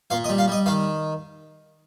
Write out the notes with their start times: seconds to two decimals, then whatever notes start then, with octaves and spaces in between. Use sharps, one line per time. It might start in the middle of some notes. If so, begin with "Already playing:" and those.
0.10 A#2 F5
0.24 D#5
0.29 G3
0.38 F5
0.48 G3 D#5
0.66 D#3 F5